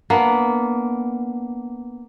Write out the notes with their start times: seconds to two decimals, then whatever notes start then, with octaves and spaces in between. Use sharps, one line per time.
0.10 A#3 B3 D4